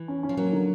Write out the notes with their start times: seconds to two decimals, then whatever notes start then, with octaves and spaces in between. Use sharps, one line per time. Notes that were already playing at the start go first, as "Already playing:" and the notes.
Already playing: E3
0.08 C#4
0.23 C#4
0.29 F3
0.37 F#3 A#3
0.53 D3